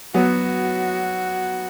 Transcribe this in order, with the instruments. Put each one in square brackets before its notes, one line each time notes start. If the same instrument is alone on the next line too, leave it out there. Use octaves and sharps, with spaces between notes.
[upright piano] F#3 B3 [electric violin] F#4